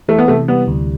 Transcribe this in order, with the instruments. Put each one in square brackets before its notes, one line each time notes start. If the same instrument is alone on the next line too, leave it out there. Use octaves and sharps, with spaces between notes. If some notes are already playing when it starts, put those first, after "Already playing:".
[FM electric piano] E3 [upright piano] A3
[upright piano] B3
[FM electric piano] C3 [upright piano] A3
[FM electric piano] G3 [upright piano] B3
[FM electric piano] D2